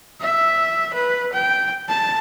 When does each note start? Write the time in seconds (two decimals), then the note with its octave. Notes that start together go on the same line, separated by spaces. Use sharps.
0.21 E5
0.94 B4
1.33 G5
1.89 A5